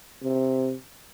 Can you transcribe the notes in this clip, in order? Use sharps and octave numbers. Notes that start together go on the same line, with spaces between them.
C3